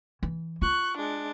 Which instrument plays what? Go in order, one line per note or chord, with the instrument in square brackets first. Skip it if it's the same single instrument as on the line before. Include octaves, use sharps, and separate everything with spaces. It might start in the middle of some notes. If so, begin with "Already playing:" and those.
[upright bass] E3
[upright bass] F4 [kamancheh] C#6 F#6
[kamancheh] G#3 D4